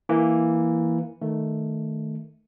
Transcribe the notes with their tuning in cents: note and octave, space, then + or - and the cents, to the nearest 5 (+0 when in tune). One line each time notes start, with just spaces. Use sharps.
E3 +0 A#3 +0
D#3 +0 A3 +0